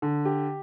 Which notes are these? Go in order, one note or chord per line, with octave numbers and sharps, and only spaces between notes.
D3
G4